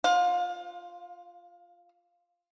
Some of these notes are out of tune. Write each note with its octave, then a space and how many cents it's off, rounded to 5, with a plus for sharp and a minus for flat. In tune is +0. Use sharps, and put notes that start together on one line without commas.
F4 +0 F5 +30